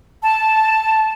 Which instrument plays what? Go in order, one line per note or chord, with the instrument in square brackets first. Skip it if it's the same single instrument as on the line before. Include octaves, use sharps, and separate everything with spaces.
[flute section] A5